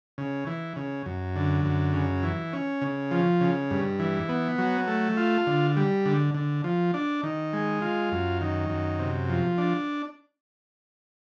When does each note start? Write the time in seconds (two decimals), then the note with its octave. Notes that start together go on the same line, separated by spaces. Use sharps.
0.18 C#3
0.47 E3
0.76 C#3
1.06 F#2
1.36 D3
1.65 F#2
1.94 C#3
2.23 E3
2.53 C#4
2.82 C#3
3.11 F3
3.41 C#3
3.71 G2
3.99 E3
4.29 B3
4.58 F#3
4.88 A3
5.17 F4
5.47 D3
5.77 G3
6.06 D3
6.34 D3
6.64 F3
6.94 D4
7.23 D#3
7.53 G#3
7.82 F4
8.12 F#2
8.41 D#3
8.70 F#2
8.99 C3
9.29 F3
9.58 D4